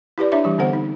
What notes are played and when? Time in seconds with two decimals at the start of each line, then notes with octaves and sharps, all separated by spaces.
0.18 E4 G4 B4 D5
0.32 D4 E4 C#5 E5 D6
0.44 E3 G3 G4
0.58 D3 B3 C4 A4 C5 F#5
0.73 D#4